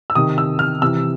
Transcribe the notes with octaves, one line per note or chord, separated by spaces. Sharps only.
E6
C3 D#3 D#6
E6
F6
C3 E3 E6